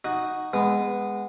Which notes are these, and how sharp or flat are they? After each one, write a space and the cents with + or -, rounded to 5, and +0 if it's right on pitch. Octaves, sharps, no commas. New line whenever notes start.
D#4 +0 F#4 +0
G#3 -15 B3 +0